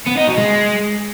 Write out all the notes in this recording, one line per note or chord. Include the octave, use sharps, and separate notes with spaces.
B3
D#4
B2
G#3